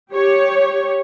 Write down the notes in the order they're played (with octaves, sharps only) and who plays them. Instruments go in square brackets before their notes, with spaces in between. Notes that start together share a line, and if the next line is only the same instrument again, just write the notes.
[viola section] G4 C#5